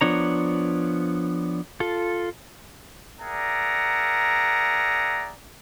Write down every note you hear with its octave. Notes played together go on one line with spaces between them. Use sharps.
F3 B3 D4 C#5 A#5
F4 A4
G#4 A#4 D5 E5 F#5 A#5